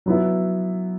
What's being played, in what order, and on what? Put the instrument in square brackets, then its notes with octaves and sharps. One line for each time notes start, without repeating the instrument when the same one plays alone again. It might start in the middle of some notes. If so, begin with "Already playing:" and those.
[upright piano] F#3 B3 E4